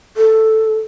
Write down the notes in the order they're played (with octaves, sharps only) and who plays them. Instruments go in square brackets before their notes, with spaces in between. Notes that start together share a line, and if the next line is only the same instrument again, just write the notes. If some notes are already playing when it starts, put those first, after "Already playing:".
[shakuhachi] A4